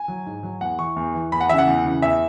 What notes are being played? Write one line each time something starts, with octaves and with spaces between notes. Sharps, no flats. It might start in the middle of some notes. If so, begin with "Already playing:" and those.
Already playing: G#5
F#3
G#2
F#3
E2 F#5
E3 C#6
E2
E3
E2 B5
F#5
C#3 E3 E5 F#5
E2
C#3 E3
E2 E5